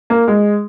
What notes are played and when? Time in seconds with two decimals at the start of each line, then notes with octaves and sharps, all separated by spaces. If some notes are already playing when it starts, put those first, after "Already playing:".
0.10 A#3
0.28 G#3